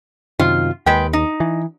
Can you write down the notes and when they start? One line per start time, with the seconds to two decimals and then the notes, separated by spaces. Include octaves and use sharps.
0.40 F#2 C3 D#3 F4
0.86 D#2 G#3 B4 G5
1.13 D#4
1.40 E3